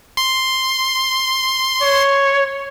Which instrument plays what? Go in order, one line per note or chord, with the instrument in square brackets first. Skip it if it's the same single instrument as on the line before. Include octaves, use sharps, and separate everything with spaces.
[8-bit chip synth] C6
[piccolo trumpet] C#5